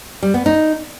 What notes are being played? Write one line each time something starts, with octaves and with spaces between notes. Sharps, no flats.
G3
B3
D#4